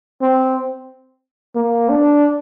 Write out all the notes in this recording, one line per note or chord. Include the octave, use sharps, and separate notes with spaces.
C4
A#3
D4